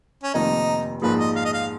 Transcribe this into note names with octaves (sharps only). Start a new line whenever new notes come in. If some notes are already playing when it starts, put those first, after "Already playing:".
C#4
F1 F2 D#3 A#3 D#4
A#1 G#2 F3 A#3 B4
D#5
F5
D#5
F5